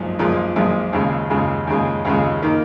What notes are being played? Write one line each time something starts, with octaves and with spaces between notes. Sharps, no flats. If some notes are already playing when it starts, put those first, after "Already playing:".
Already playing: B1 A#2 F3 G#3
B1 A#2 F3 G#3
B1 A#2 F3 G#3
D#2 C#3 G#3
D#2 C#3 G#3
D#2 C#3 G#3
D#2 C#3 G#3
D#3 A#3